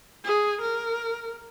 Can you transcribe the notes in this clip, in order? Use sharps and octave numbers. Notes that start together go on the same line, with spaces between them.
G#4
A#4